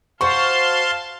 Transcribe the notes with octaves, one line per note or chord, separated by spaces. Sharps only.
F#4 C5 F5 A5 C6 C#6